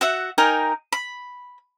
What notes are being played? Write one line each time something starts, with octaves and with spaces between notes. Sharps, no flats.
F#4 E5 F#5
D#4 A#4 G5 G#5
B5